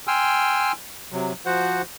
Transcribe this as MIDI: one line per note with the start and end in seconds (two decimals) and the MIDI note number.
0.07 0.72 79
0.07 0.72 80
0.07 0.72 84
0.07 0.72 88
0.07 0.72 89
1.12 1.33 48
1.12 1.33 54
1.46 1.82 53
1.46 1.82 66
1.46 1.82 72
1.46 1.82 78